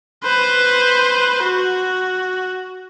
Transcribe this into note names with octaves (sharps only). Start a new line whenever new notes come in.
B4 C5
F#4